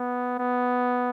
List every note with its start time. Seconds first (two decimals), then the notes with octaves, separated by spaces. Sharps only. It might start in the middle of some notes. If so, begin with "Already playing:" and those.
Already playing: B3
0.39 B3